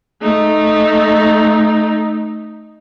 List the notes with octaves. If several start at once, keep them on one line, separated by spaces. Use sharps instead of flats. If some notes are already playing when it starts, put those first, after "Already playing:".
A3 D#4